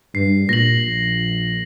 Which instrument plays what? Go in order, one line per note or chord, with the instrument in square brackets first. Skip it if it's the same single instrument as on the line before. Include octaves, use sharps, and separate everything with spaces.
[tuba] G2 [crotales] C7
[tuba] A#2 [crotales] A#6 F#7
[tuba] A#1